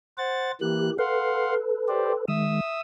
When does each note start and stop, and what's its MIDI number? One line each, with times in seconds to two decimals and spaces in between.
0.18 0.51 72
0.18 0.51 78
0.18 0.51 93
0.61 0.90 52
0.61 0.90 58
0.61 0.97 67
0.61 0.90 90
0.99 2.25 69
0.99 2.25 71
0.99 1.54 77
0.99 1.54 78
0.99 1.54 84
1.88 2.12 67
1.88 2.12 72
1.88 2.12 74
2.28 2.61 51
2.28 2.61 56
2.28 2.81 76
2.28 2.81 87
2.28 2.81 88